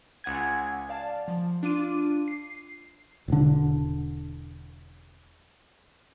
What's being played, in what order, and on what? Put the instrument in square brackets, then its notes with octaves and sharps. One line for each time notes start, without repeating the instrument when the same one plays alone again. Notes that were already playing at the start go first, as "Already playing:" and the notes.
[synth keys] C#2 F#5 G#5 G#6
D5 F5 A5
F3
D4 F4 D6 D#7
C7
[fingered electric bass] E1 D3